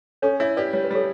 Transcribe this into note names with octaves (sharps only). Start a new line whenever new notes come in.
C#4 A4 C#5
E4 C#5 E5
G4 B4 D5
G3 C#5
B4
G3 A4 C#5